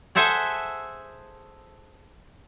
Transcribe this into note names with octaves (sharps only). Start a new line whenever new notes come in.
G#4 A4 C5 E5 F#5 G#5